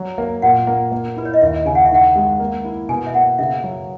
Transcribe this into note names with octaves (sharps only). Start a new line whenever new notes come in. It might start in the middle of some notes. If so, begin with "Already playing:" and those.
Already playing: F#3
A#3
A#2 F#5
A#3
A#3
E4 B4
C#5
D#5
D#2 E5
C#3 G#5
F#5
E5
D#3 F#5
G#3
A#3
E4
B2 G#5
E5
A#3 F#5
C#3 E5
F#3